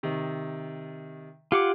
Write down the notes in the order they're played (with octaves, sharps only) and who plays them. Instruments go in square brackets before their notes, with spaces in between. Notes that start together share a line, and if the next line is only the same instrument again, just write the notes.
[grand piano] C3 D#3
[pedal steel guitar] F4 F#5 D6 [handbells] G4